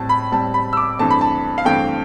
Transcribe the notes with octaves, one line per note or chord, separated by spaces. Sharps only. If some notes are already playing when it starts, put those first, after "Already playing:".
Already playing: A2 G3 C4 A5
B5
A2 G3 C4 A5
B5
E6
D6
G2 E3 A3 C4 A5
B5
A5
F5
G2 E3 A3 C4 G5